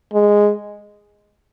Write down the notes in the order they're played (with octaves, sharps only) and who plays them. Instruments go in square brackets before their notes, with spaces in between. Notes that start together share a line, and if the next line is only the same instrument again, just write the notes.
[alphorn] G#3